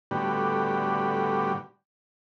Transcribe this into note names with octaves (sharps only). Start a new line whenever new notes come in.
A2 D3 G3 B3 F#4 G4